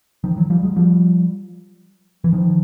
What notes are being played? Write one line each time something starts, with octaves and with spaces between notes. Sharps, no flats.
D#3 F3
E3 F#3
F3 G3
F#3 G#3
F3 G3
E3
D#3 F3